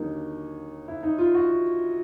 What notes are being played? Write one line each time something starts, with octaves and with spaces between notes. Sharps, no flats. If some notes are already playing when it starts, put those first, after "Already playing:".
Already playing: D#2 D3 F#3 A#3 D#4
E4
D#4
F4
F#4
F4